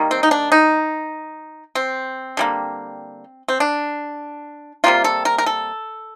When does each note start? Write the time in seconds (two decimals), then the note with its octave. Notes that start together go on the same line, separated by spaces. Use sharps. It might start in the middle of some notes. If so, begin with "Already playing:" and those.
Already playing: D#3 G3 A#3
0.11 C4
0.23 D#4
0.31 D4
0.52 D#4
1.75 C4
2.37 D3 G3 A#3
3.48 C4
3.60 D4
4.84 C3 G3 A#3 F4
5.04 A4
5.25 A#4
5.38 A#4
5.46 A4